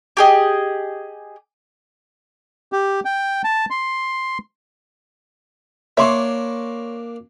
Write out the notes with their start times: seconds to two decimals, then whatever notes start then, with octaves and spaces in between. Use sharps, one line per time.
0.17 G4 G#4 D#5
2.72 G4
3.05 G5
3.44 A5
3.70 C6
5.97 A#3 D4 C#5 E5 C6 C#6